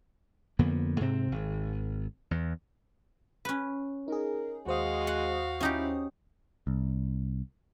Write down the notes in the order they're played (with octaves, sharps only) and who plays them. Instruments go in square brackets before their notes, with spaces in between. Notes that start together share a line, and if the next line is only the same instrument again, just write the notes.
[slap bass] F2 D3 A#3 B3
G#2 C3 C4
G#1
E2
[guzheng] C#4 B4
[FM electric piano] D#4 G#4 [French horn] A#4
[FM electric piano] D#2 C5 D#6 [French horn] G#3 [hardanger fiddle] F#4 F5
[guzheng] F#5
[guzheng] C#4 D#4 G4 [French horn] E4
[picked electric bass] C2